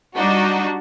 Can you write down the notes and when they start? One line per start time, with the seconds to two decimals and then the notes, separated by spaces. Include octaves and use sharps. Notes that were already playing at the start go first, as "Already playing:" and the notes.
0.15 G3 D4 D#4 F#4